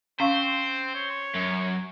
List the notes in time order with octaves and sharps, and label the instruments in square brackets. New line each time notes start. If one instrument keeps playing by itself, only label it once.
[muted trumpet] C4 [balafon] C#4 F5 C#6 [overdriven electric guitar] C5
[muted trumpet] C#5
[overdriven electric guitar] F#2